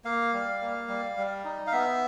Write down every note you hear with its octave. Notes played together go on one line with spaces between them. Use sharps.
A#3 F5
G3
A#3
G3
G3
D#4
F5
B3 E5